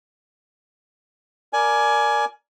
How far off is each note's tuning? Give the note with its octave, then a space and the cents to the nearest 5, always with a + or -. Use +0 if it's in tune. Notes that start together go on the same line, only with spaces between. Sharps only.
A#4 +0 D5 +0 G#5 +20